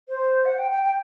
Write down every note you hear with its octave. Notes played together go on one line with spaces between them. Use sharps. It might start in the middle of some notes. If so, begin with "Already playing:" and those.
C5
F#5
G5
G5
G5